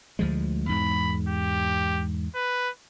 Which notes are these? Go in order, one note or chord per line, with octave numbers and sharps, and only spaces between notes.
D2 F3 G#3
E2 G#2 B5
G4
B4